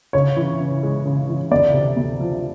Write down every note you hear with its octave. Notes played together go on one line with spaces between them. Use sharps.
C#3 C#5
E3
C#4
G#3
C#3
E3
D2 D5
C3
D2
F3